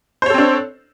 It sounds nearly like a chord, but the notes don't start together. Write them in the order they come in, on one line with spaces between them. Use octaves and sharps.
C5 C#5 A4 C4 D4